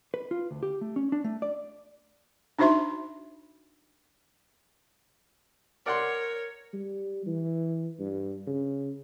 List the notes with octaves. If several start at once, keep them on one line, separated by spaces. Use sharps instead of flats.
B4
F4
D2
G4
A3
C#4
D4
A3
D5
D4 D#4 F#4 C5 E5 C6
A#4 C#5 D5 F#5 C6
G3
E3
G2
C#3